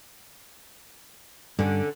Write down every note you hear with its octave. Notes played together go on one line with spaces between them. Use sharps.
G2 D3 C#4